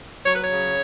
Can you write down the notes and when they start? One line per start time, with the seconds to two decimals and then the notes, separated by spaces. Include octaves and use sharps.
0.24 F#3 C#5
0.34 B4
0.42 C#5
0.48 C#3